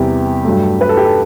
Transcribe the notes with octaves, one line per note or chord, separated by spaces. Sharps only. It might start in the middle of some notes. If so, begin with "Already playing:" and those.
Already playing: E2 C3 E3 G3 G4
G2 F#3 A3
B4
A4
G4
A4